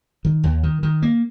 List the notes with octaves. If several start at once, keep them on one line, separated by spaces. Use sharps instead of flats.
D#3
D#2
D#3
D#3
A#3